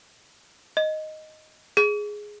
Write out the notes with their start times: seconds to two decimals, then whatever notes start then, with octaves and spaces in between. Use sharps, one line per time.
0.77 D#5
1.77 G#4